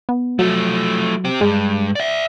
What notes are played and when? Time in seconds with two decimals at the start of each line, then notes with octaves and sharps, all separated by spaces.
0.09 B3
0.39 F3 F#3 A3
1.25 C4 G4
1.41 G2 G#3
1.95 D5 E5